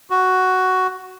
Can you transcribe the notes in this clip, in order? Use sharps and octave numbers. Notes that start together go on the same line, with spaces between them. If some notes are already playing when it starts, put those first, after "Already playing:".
F#4